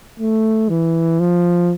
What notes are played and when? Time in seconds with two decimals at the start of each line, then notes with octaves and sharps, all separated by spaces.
0.20 A3
0.69 E3
1.20 F3